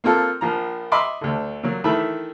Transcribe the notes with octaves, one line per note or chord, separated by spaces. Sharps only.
A#3 C4 F4 A4
A#1 F3 A#5
D#5 E5 B5 C6 D6 D#6
D2 D3
A#2 F#3
D#3 E3 A3 E5 B5